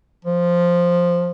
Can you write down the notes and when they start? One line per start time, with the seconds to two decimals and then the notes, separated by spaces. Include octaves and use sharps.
0.25 F3